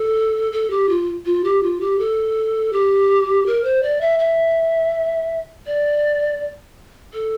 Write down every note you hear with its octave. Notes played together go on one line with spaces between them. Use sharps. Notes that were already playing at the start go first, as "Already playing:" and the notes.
Already playing: A4
A4
G4
F4
F4
G4
F4
G4
A4
G4
A#4
C5
D5
E5
E5
D5
A4